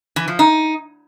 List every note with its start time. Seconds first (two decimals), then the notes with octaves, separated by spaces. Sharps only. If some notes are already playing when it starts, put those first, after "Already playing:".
0.16 E3
0.28 F3
0.39 D#4